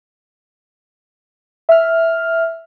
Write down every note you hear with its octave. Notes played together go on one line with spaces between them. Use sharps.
E5 F6